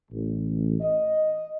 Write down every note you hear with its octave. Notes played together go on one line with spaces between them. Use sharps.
A1
D#5